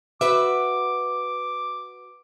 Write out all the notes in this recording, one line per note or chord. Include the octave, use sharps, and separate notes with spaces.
F#4 B4 E5 D6